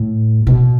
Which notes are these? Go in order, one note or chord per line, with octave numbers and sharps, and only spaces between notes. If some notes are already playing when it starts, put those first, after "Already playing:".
Already playing: A2
B2